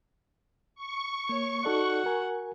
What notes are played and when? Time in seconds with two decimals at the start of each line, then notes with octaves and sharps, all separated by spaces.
0.75 C#6
1.29 A#3 C#5
1.65 D#4 F#4 A4 D5 F#5
2.06 A#4 G#5